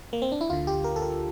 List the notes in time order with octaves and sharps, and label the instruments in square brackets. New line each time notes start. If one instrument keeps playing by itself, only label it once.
[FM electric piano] A#3
C4
D4
E4
D2 D3 F4
G4
A#4
A4
A#4